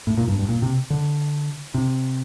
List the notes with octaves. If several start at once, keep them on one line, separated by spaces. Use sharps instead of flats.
A2
A#2
G2
G2
A#2
C3
D3
C3